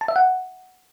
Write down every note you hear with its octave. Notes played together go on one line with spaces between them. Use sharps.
A5
E5
F#5